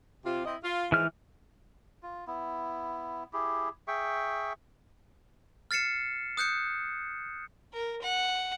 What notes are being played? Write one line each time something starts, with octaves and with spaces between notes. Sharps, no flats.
C3 F4
C4 E4 D#5
F4
G#2 E3 F3 G#3 F6
F4
B3 E4
E4 G4 G#4
G#4 E5 G5 C#6
F6 A6 C7 C#7 E7
D#6 F#6 G6 C#7
A#4
F#5